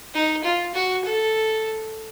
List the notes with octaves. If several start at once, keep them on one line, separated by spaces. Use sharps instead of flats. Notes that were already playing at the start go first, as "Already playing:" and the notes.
D#4
F4
F#4
A4